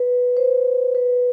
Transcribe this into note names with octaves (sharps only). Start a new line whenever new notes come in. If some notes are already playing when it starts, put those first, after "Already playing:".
Already playing: B4
C5
B4